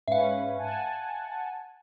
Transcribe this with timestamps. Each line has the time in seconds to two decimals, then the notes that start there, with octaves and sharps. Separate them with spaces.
0.08 G#2 C#4 B4 E5 F5
0.58 F#5 G#5 A5